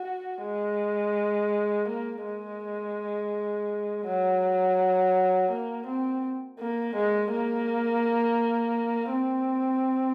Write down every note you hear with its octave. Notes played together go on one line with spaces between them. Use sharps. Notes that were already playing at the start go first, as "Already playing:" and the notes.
Already playing: F#4
G#3
A#3
G#3
F#3
A#3
C4
A#3
G#3
A#3
C4